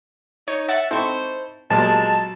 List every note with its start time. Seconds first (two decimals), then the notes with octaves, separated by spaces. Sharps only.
0.48 D#4 C#5
0.68 E5 F#5 A6
0.91 C4 D#4 E4 A4 C5 C#6
1.70 B1 A#2 F3 G3 G#3 A#3 A5